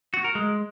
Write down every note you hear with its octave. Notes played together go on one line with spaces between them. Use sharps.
F#4
A#4
G#3